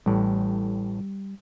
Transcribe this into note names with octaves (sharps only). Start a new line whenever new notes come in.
A1 A2 G3